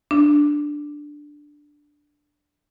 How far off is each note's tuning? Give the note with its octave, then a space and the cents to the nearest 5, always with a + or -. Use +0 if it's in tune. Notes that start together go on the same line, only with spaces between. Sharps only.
D4 +0